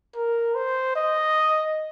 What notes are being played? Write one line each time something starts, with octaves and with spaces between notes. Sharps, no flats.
A#4
C5
D#5